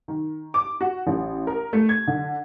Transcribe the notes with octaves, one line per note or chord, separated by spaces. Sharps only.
D#3
D6
F#4
A1
A#4
A3
G#6
D3